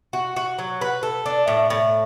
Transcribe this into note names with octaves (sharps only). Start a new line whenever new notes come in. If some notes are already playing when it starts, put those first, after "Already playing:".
F#4
F#4
F#3
B4
A4
D4
A2
A2